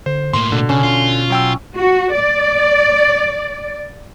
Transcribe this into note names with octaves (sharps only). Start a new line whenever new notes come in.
D3 C5
A2 A#3 C6
B2 D3
C#3 C#4
F4
F#3 G5 E6
F#4
D5